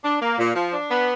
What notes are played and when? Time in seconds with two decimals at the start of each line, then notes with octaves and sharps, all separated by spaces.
0.04 D4
0.21 A#3
0.39 A#2
0.55 F3
0.73 D4
0.90 B3